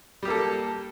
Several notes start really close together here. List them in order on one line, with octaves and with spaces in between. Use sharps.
G3 G4 A#3 A4